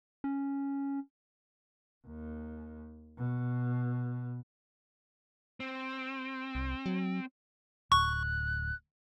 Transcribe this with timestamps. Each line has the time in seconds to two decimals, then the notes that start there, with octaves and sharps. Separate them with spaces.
0.24 C#4
2.07 D#2
3.18 B2
5.60 C4
6.55 C2
6.86 F#3
7.92 D1 C#6 F#6